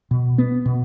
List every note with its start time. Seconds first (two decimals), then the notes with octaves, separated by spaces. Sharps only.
0.11 B2
0.38 B3
0.66 B2